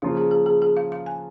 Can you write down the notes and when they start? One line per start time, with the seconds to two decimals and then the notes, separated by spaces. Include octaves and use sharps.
0.02 C#3 F3 A#3 F4 F5
0.17 G#4
0.31 G#4
0.46 G#4
0.62 G#4
0.77 F5
0.92 F5
1.06 G#5